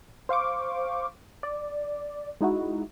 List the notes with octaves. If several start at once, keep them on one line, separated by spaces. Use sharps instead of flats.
C5 F5 C#6 D6
D5
G#3 D#4 E4 F#4